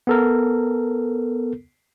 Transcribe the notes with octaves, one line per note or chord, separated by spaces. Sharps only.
B3 A4 A#4